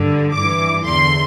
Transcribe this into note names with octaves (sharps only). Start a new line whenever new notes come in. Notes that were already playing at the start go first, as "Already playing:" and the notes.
Already playing: G2 D3
G2 E3 D6
E2 D3 C6